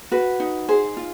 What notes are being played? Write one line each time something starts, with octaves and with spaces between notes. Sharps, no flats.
F#4 B4
D#4
G#4 C5
F4